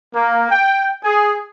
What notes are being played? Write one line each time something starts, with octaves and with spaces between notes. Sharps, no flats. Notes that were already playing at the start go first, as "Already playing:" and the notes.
A#3
G5
G#4